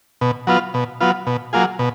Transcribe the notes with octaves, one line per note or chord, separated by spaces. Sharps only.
B2
F#3 B3 F4
B2
F#3 B3 F4
B2
F#3 A#3 F4 G#4
B2